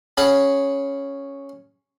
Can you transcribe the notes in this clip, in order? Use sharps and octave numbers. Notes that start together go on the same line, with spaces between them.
C#4 G#4 F#5 B5 C#6 D#6